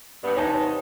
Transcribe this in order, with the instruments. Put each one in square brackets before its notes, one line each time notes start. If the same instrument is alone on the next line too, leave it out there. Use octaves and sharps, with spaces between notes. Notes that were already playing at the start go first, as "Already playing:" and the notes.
[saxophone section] G2 B3
[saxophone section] C3 B3 D#4 [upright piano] C#5 G#5 A5